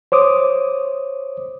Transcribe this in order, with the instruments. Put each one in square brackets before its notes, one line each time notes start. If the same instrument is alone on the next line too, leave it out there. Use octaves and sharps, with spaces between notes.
[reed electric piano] C5 C#5 D6 D#6